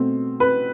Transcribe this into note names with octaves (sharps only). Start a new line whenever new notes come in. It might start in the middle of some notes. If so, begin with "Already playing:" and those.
Already playing: B2 A3 C4
B4